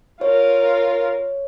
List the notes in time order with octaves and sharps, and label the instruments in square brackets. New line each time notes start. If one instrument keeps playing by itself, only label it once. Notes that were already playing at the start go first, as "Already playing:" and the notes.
[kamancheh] F4 A#4 [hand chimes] C#5